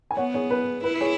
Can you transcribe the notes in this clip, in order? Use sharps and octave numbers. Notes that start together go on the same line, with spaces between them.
G#5
B3 C#5 F#5
G#4 C#5
B4
E4 B4
G#4 C#5